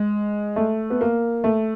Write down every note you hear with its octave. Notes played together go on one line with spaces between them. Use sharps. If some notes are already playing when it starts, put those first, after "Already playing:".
Already playing: G#3
A3
B3
A#3
A3